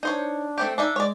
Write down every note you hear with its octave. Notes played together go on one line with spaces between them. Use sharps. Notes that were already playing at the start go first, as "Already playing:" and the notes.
D4 D#4 C5 C#5
A3 C4 G4
D4 D#4 E5
G#3 C#5 D5